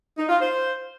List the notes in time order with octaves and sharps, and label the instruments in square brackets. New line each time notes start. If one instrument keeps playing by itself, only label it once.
[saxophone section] D#4
F4
C5